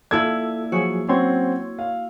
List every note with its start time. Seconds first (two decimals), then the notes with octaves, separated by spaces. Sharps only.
0.11 A#3 E4 F4 A4 D5 E6 G#6
0.72 F3 F#3 F#4 G#4
1.09 F#3 C4 C#4 C#5 C6 G#6
1.79 F5